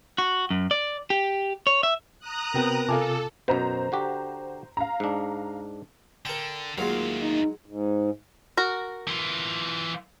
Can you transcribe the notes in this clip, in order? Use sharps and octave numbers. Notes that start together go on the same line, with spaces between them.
F#4
F#2
D5
G4
C#5
E5
A#5 D#6 F#6
C3 B3 C4 F#4 A#4 G5
C3 F4 A4 F5 G#5 A5 D6
F#2 B2 C5 A#5
D3 F#4 G4
F5 A#5
G#2 D4
D3 A#4 G5
E2 D#3 F#3 G#3 A#3 F4 F5
D#4
G#2
F#4 A#4
E3 F4